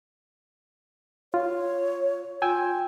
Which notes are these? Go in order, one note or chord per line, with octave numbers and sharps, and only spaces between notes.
F4 C#5
F4 G5 G#5 E6